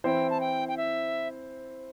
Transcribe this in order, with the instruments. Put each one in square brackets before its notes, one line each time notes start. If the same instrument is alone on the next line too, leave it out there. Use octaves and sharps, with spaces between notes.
[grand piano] E3 C4 E4 C5 [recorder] G5
[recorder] A5
G5
G5
E5